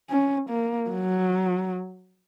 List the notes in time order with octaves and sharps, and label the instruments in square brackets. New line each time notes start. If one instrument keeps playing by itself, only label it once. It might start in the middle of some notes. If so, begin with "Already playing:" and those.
[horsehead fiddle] C#4
A#3
F#3